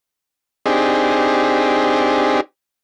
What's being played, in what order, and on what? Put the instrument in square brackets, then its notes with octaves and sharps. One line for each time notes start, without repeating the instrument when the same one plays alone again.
[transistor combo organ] C4 D4 D#4 G4 G#4